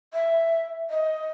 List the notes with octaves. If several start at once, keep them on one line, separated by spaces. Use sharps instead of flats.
E5
D#5